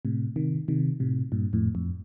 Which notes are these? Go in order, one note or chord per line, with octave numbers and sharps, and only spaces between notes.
A2 C3
C3 D#3
C3 D#3
A2 C3
G2 A#2
F2 A2
F2